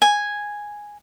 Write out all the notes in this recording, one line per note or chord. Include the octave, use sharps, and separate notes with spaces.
G#5